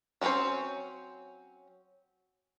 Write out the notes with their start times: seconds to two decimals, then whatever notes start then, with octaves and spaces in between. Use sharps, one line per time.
0.21 F#3 G#3 C4 C#4 C5